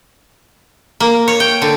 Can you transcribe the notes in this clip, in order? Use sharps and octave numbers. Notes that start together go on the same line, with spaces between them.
A#3
C#5
G5
D3